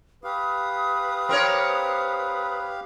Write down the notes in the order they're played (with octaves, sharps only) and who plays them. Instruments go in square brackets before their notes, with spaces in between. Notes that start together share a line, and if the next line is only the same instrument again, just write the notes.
[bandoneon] G4 F5 [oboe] B4 [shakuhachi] D#6
[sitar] C4 A#4 C#5